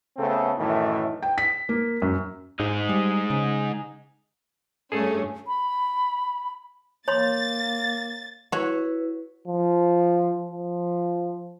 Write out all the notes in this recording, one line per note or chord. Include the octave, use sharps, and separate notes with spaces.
C#3 A3 B3 C4 A4
F#2 A2 D#3 E3 A3
G5
B6
A#3
F#2
G#2 G#3 D#4
G3
C#3
G2 A3 C#4 G#4 A4
B5
A#3 C#5 B5 C6 A6
E4 F#4 B4 C#5
F3
F3